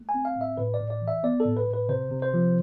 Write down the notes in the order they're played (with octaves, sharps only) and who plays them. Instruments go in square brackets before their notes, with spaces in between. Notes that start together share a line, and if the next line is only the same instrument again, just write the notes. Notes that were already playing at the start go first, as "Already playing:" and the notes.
Already playing: [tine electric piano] A3
G#5
C4
F5
A2
E5
A2 B4
D5
A2
D5
E3
E5
B3 D5
A4
A2
B4
A2
B4
C3 C5
C3
C5
F3